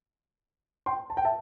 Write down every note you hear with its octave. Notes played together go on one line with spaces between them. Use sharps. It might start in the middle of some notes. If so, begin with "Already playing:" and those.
G5 C6
A5
G5
E5 A5